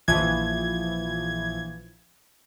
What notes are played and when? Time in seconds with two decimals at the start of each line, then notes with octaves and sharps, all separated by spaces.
0.08 A#1 E3 F3 G#6